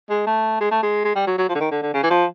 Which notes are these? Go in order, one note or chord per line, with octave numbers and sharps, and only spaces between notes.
G#3
A3
G#3
A3
G#3
G#3
G3
F#3
F#3
F3
D3
D#3
D3
D3
C#3
E3
F3